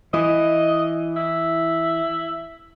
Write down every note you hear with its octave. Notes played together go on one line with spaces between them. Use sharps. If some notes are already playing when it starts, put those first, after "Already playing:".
E3 D#5
E4